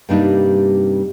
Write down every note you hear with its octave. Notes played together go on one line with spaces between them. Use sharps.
G2 C3 G3 A#3 D4 D#4